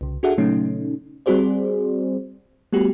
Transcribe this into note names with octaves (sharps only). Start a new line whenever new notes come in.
C2 C#3
D4 F#4 G#4 A4 E5 F#5
A#2 C#3 F#3 A3 C#4 D#4
G3 C4 F#4 G#4 C5 D5
G3 A3 B3 F#4 G4